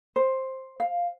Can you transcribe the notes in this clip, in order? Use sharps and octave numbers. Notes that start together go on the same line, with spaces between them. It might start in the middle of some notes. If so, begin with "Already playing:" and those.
C5
F5